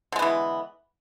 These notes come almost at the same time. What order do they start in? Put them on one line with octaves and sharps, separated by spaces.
D3 G#3 B3 E3